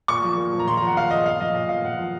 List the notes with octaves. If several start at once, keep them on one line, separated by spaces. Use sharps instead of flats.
A#2 C#6
F3
A#2
F3
A#5
A#2 C6
A#5
F3
F#5
A#2 F5
F3 D#5
A#2 F5
F3 D#5
A#2 D#5
F3 F5
A#2 F#5
F3